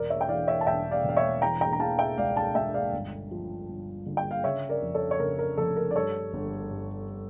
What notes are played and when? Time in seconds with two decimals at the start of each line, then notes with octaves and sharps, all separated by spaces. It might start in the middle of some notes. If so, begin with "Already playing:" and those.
Already playing: E1 A#4 D5
0.10 C#5 E5
0.21 G5
0.29 E3 D5 F5
0.47 C#5 E5
0.61 A5
0.67 E1 E5 G5
0.91 D5 F5
1.04 E1
1.09 F5
1.17 C#5 E5
1.42 E3 G5 A#5
1.61 G5 A#5
1.73 A#5
1.80 E3 F5 A5
1.99 E5 G5
2.18 C#2 D5 F5
2.36 F5 A5
2.55 C#2 E5 G5
2.74 D5 F5
2.93 G1
3.31 F3
3.68 G1
4.06 D3
4.17 G5
4.31 F5
4.44 C#3 C#5 E5
4.69 A#4 D5
4.82 F2
4.94 A4 C#5
5.11 C#5
5.19 C#3 A#4
5.39 A#4
5.57 F1 A4
5.76 A#4
5.91 D5
5.96 G2 A4 C#5
6.33 G1
6.71 G2